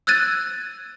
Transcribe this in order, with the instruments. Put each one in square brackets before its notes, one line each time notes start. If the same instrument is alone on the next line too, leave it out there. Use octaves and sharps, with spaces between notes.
[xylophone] E6 F#6 G#6 A6 D#7